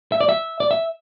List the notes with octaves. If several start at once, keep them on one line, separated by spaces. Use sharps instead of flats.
E5
D5
E5
D5
E5